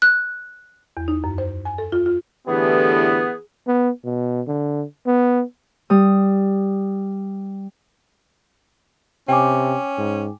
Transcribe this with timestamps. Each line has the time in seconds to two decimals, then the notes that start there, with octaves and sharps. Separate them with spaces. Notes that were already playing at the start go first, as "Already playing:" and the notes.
0.02 F#6
0.97 E2
1.08 D#4
1.24 F#2
1.38 C5
1.65 G#5
1.78 A4
1.92 F4
2.06 F4
2.47 A2 D3 E3 B3 G4 G#4
3.67 B3
4.05 B2
4.48 D3
5.06 B3
5.90 G3 D#6
9.29 C3 C#4 G5 G#5 D6
9.98 G#2